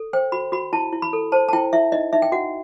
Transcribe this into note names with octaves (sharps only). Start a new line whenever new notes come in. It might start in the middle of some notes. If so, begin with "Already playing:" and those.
Already playing: A4
C5 G5
F#4 B5
F#4 B5
E4 A5
E4
B5
A4
C5 A5
A5
E4 G5
E4 E5
D#4 D#5
D#4 E5
G5
F#4 F#5